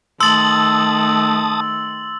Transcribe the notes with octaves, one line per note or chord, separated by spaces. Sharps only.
D#3 A3 A5 C6 D#6 E6 A6 F#7